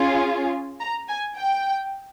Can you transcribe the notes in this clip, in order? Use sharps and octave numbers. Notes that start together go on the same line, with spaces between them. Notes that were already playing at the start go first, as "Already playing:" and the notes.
Already playing: C#4 F4 G#4
A#5
G#5
G5